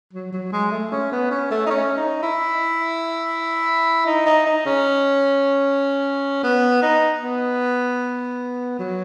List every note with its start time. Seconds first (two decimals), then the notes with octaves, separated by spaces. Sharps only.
0.13 F#3
0.32 F#3
0.52 G#3
0.72 A3
0.92 C#4
1.12 B3
1.31 C#4
1.51 A3
1.66 D#4
1.70 C#4
1.97 D#4
2.23 E4
4.07 D#4
4.26 D#4
4.46 D#4
4.66 C#4
6.43 B3
6.83 D#4
7.22 B3
8.79 F#3